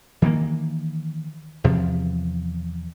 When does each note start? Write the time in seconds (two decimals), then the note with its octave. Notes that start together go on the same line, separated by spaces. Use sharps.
0.22 D#3 E3 G#3 A#3
1.64 E2 C3 F3